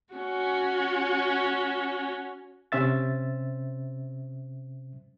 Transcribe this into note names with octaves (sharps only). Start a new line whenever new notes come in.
C#4 F#4
C3 C#4 C5 E5 A6